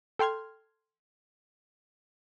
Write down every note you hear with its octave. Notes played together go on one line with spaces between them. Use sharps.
A4 G5 C6 F6 G#6